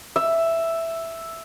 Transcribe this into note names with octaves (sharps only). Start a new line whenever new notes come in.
E5